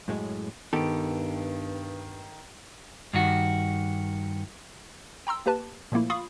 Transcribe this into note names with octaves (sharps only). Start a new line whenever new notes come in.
F#2 A2 G#3
G2 D#3 B3 G4 A4 D7
G2 D#3 F#4
G5 A#5 C6 E6
A#3 G4 B4 A5
A#2 F3 A3 A#3 E4
F4 F5 B5 C#6 D#6